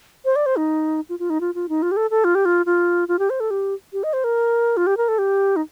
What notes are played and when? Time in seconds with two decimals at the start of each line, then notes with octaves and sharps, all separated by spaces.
0.25 C5
0.36 D5
0.46 C5
0.57 D#4
1.09 F4
1.19 F4
1.30 D#4
1.41 F4
1.55 F4
1.69 D#4
1.82 F4
1.91 G4
1.97 A4
2.11 A4
2.24 F4
2.35 G4
2.45 F4
2.66 F4
3.08 F4
3.19 G4
3.30 C5
3.40 A4
3.51 G4
3.93 G4
4.04 D#5
4.13 C5
4.24 A#4
4.77 F4
4.87 G4
4.97 A#4
5.08 A4
5.18 G4
5.56 D#4